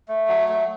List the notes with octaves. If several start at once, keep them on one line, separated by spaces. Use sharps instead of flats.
A3
F#3
A3